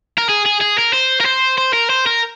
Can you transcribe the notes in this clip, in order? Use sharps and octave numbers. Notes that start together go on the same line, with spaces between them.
A#4
G#4
G#4
G#4
A#4
C5
A#4
C5
C5
A#4
C5
A#4